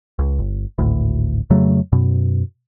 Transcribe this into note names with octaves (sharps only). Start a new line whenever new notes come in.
C#2
G1
G#1 D2 A2
F2 C#3 F#3 A3
F#2 B2